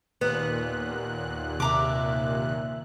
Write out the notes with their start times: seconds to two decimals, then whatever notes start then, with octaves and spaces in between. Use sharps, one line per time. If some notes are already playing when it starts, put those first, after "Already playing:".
0.21 D#2 A#2 B3 F#6
1.60 C3 E5 A#5 D6